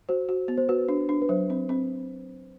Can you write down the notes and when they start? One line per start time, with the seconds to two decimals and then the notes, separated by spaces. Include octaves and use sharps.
0.09 F#4 C5
0.29 F#4
0.48 B3
0.58 C5
0.69 F#4 B4
0.89 D4
1.09 D4
1.22 B4
1.29 F#3 C5
1.50 C4
1.69 C4